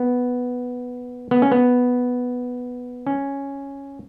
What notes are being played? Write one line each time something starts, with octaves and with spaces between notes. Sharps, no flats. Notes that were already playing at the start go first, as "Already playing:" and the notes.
Already playing: B3
B3
C#4
B3
C#4